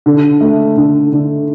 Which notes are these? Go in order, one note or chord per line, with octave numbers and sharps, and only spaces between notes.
D3
A3
D3
D3